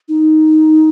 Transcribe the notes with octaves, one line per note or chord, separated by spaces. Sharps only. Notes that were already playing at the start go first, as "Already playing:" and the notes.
D#4